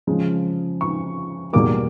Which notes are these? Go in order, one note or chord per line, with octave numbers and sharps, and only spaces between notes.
C#3 F3 G#3
C#6
E2 B2 G3 A#3 D6